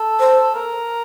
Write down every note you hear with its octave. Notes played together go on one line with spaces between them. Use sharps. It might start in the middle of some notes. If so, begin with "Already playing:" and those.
Already playing: A4
C5
A#4